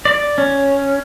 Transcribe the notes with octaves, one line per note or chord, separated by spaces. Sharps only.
D5
C#4